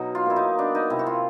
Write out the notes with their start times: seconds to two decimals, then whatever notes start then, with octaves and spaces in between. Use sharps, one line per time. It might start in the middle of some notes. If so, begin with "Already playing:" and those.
Already playing: B2 F#3 D#4
0.15 F4
0.26 A#3 E4
0.36 D#4
0.58 B3 D4
0.75 D#4
0.90 C3 E4
0.99 F#4
1.07 F4